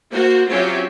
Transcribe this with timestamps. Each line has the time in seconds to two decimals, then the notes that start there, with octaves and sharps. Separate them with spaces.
0.10 A#3 F#4 C5
0.49 F#3 C4 C#4 F4 G4 E5